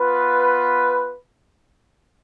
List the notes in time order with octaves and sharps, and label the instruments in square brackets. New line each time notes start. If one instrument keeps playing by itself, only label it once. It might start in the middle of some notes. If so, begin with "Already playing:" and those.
Already playing: [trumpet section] B3 F4 B4